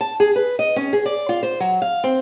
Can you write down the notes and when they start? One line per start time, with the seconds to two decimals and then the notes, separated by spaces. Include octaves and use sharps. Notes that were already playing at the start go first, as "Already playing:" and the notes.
0.01 A5
0.20 G#4
0.36 B4
0.59 D#5
0.76 C#4
0.93 G#4
1.06 D5
1.29 F4
1.43 C5
1.60 F#3
1.82 F5
2.04 C4